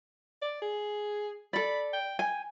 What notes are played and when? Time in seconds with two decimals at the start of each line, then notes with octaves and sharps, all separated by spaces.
0.42 D5
0.62 G#4
1.53 A4 D5 B5
1.93 G5
2.19 G5 G#5